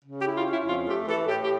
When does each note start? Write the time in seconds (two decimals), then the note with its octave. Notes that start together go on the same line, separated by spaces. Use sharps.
0.05 C#3
0.20 G4
0.25 E4
0.36 F4
0.46 C#4 E4
0.66 F2 F4
0.88 A3 G4
1.08 E3 A4
1.28 A2 G4
1.43 G4